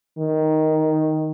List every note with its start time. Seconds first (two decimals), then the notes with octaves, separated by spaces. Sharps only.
0.18 D#3